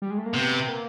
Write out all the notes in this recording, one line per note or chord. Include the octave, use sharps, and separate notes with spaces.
G3
G#3
A3
A#3
C3 B3
A#3